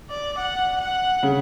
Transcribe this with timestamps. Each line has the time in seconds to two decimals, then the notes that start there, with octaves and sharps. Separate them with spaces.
0.10 D5
0.38 F#5
0.81 F#5
1.23 C#3